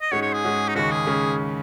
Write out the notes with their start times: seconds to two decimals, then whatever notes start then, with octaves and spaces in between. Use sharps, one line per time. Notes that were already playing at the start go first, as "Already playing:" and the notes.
0.01 D#5
0.11 G#2 G#3 C#4 F#4 C#5
0.22 C#5
0.33 G#4
0.44 G#2 G#3 C#4 F#4
0.68 D#4
0.75 D#2 C#3 G#3 C#4 F#4
0.91 G#4
1.07 C#3 G#3 C#4